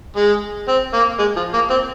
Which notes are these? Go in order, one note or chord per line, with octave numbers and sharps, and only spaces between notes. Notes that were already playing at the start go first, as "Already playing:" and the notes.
G#3
C4
A#3
G#3
F3
A#3
C4